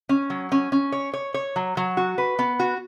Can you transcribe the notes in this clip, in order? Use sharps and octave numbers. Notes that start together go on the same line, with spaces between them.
C#4
F#3
C#4
C#4
C#5
C#5
C#5
F#3
F#3
F#4
B4
B3
F#4